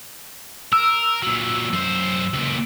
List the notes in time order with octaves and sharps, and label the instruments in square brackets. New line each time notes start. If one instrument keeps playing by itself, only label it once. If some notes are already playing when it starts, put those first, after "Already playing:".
[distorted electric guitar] A#4 [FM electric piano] E6
[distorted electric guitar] A#2 F#3
F#2 C5
C#2 A#2